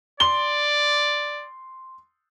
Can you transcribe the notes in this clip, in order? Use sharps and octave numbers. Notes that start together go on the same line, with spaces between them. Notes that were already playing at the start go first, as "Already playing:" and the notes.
D5 C6 G7